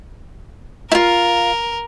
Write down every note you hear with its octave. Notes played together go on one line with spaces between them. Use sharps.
E4 F4 A#4